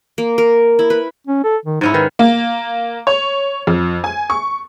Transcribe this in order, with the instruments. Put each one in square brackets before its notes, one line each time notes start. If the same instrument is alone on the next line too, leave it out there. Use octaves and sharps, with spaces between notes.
[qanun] A#3
A#4
E4
B4
[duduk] C#4
A4
D#3
[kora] G#2 C#4 E4 [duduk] D#4
[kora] D#3 [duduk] B4
[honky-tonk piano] A#3
C#5
F2
G#5
C#6